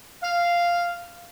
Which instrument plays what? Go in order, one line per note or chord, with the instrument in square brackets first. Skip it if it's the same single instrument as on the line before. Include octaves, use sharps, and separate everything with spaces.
[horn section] F5